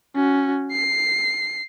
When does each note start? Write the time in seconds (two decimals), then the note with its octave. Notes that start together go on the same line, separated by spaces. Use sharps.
0.15 C#4 F#4
0.73 C7